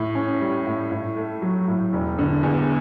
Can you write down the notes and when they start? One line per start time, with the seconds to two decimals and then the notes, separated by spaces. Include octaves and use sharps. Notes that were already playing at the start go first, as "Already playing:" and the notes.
Already playing: A2
0.15 C#4
0.41 G3
0.67 A2
0.92 A2
1.16 A3
1.42 F#3
1.68 A2
1.93 E1
2.18 D3
2.43 E2